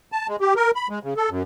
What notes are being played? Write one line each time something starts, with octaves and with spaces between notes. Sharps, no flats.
A5
G#3
G4
A#4
B5
G#3
C#3
A4
F#2